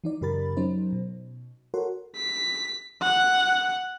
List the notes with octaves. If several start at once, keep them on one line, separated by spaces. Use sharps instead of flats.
E3 D#4 D5
F#2 C#3 G4 A#4 B5 A6
F#3 C#4 D#4 C5
B2
F#4 A4 A#4 C#5 F#5 C6
B6
F#5